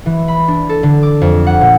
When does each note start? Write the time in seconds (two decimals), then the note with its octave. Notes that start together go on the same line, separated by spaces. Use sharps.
0.06 E3
0.28 B5
0.48 D4
0.69 A4
0.83 D3
1.03 D6
1.21 F2
1.47 F#5
1.61 A#2